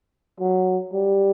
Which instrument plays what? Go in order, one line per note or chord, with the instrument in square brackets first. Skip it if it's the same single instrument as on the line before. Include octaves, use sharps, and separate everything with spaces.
[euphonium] F#3
G3